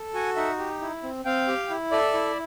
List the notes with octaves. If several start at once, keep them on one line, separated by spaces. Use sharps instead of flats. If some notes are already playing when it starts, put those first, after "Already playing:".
Already playing: A4
F#4 F#5 G#5
D#4 E5 F#5
G4
E4
C4
C4 F5 G5
G4
E4
A4 D5 E5
E4